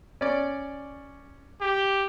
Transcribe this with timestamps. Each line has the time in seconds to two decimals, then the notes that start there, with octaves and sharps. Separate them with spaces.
0.21 C#4 D5
1.61 G4